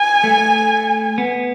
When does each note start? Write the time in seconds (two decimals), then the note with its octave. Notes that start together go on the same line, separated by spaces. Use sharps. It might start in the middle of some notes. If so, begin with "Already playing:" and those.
Already playing: G#5
0.24 A3
1.18 B3